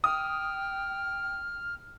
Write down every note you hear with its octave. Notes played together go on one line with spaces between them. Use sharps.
G5 D#6 F6